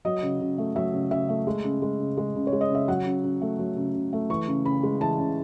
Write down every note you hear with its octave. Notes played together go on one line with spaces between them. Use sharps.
F#3 D#5
C#3
C#3
A3
F#3 E5
C#3
C#3 E5
A3
G#3
C#3
G#3
C#3
G#3
C#3
C#5
G#3
D#5
C#3 E5
F#3 F#5
C#3
C#3
A3
F#3
C#3
C#3
A3
E3 C#6
C#3
C#3 B5
G#3
E3 A5
C#3